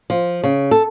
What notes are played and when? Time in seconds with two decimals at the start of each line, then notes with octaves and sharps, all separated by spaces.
0.10 F3
0.44 C#3
0.71 A4